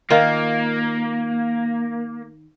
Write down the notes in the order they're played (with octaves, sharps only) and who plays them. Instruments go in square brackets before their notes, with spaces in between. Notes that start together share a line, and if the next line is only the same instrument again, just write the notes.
[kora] D#3 F4 [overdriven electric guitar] A#3